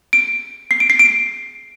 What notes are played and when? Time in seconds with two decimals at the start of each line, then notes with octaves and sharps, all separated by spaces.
0.13 D7
0.71 C7
0.80 D7
0.90 C7
0.99 D7